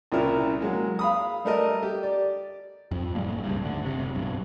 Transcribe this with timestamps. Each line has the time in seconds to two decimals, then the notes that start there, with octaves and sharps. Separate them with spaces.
0.12 C2 A#2 C#3 E4 A#4
0.60 F#3 G#3 A#3
0.99 F5 B5 D#6
1.45 G3 A3 A#4 D#5
1.83 G4
2.03 D5
2.91 F2
3.15 F#1 A2 G3 A#3
3.44 C#2 G2
3.63 D2 D3
3.81 F#1 C3
4.15 B1 G2